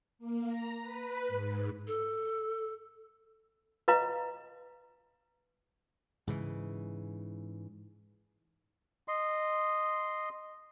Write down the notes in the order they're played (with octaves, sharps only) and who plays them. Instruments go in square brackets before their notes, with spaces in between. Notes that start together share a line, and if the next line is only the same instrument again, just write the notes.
[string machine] A#3
A#5
B4
G#2
[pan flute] A4
[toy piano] B4 D#5 F5 A#5
[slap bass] G#2 C#3 E3
[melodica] D#5 C6